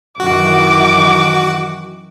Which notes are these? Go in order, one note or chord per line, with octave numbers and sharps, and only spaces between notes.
F#2 D#3 E3 F#4 D6